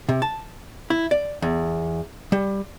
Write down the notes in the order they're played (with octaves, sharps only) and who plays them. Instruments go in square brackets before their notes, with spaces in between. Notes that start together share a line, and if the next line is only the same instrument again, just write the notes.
[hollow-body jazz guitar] C3
A5
E4
D5
E2
G3